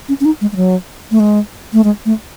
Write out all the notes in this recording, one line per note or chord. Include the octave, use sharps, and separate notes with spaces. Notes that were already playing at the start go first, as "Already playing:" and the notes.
C#4
C#4
D#4
G#3
G#3
F#3
A3
G#3
A3
G#3
A3